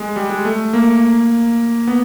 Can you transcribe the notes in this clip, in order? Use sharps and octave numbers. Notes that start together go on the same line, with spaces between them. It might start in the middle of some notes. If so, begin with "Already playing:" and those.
Already playing: G#3
G3
G#3
A3
A#3
B3